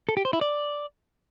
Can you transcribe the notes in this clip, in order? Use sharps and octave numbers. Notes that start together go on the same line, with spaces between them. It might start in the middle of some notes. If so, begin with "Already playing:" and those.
A4
G4
C5
E4
D5